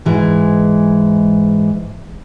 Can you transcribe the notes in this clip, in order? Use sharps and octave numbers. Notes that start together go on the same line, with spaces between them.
G#2 E3 G#3